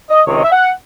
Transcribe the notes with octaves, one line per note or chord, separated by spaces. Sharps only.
D#5
C#2 C3 D#3 C#5
D#5
E5
F#5